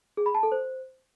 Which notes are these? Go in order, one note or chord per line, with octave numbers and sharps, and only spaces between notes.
G#4
B5
A5
A4
C5